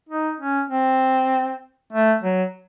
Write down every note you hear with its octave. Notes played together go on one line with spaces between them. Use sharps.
D#4
C#4
C4
A3
F#3